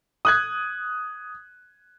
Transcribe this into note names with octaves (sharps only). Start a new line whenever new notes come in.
D#6 F#6 G#6